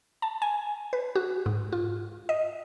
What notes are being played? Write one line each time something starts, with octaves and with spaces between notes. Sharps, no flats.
A5
G#5
B4
F#4
G#2
F4
D#5